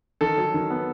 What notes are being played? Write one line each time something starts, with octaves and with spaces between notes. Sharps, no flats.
D#3 A4
F#3
D#3
B3